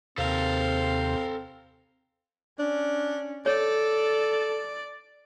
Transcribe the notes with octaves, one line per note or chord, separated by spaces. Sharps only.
D#2 C3 C4 A4 A#4 C5 F5
C#4 D4
A4 C#5 D5